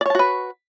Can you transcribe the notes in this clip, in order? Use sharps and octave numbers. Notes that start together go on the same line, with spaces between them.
F#4 B4 C#5 D5 A5